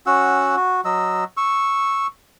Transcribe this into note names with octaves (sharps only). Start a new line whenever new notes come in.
C#4 F#4 F#5 E6
F#4
F#3 D#5 E6
C#6 E6